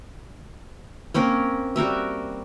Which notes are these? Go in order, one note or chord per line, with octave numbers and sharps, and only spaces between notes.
A#3 C4 C#4 A#4
G3 F#4 A#4 E5